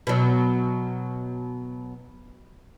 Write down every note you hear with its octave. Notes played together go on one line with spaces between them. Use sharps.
B2 F#3